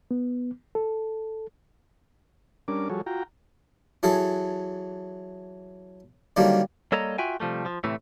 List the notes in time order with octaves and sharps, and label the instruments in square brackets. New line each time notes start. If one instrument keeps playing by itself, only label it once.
[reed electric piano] B3
A4
[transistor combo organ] G3 C#4 D4 A#4 D6
F3 G3 F#4 G#4 A4 C#5
F4 F#4 G5 A#5
[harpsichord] E3 F#3 G#4 A4
D3 D#3 F#3 G3 A#3
[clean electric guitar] G3 A#3 A4 C#5 D#5 A#5
F4 F#4 E5 G5 G#5
C3 F3 G3 A3
F3
A2 C3 E3 A3